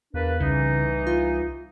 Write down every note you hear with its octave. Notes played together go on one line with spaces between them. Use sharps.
E2 A#3 D4 B4
C2 C#3 E3 D#4
F4